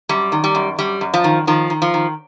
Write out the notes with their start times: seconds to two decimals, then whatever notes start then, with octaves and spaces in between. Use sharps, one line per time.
0.09 F#2 G3
0.32 D#3
0.44 G3
0.55 F#2
0.79 F#2 G3
1.01 F#2
1.14 F3
1.24 D#3
1.47 D#3 F3
1.70 D#3
1.82 F3
1.94 D#3